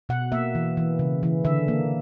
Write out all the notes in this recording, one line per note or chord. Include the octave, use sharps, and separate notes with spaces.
B2 F#5
A#3 E5
E3
E3
C#3
E3
D3 E5
A#3